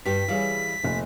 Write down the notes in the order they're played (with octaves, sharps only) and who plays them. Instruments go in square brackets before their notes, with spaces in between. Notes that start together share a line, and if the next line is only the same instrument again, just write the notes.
[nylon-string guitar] G2 G4 [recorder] B6
[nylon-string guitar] E3 G3 [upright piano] G#4 C#5 F5
[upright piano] F1 A#1